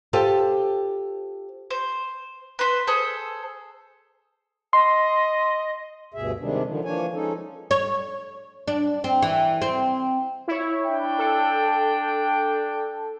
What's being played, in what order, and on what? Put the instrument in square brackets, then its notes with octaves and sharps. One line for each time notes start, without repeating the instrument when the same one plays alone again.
[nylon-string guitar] F4 G4 A4 C5
[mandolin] C5
B4 C5
G#4 A4 C5
[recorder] D#5 [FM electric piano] C6
[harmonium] D2 G2 B2 G#4 E5
C3 D#3 G3 G#3 D4
D3 D#3 F3
E3 F3 A#3 D4 C#5 G#5
F3 G#3 C#4 D#4 A4
[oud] C#5
D4
C4
E3
C4
[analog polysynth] E4 C#5
[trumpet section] D4 G5
[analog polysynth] A4